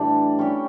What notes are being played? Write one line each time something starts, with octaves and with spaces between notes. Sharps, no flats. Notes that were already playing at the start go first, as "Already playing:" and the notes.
Already playing: A2 E3 G3 D4
G3 C#4 G4